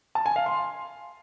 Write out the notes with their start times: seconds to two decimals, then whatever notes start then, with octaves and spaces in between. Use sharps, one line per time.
0.15 A5
0.26 G#5
0.36 F5
0.46 C6